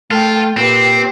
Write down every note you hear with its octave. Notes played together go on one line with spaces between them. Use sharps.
A3 F4 A4 G5
A#2 C4 G4 B4